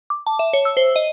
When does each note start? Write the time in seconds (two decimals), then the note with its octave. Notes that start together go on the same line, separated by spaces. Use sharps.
0.10 D6
0.27 A5
0.39 E5
0.53 C#5
0.65 E6
0.77 C5
0.96 D#5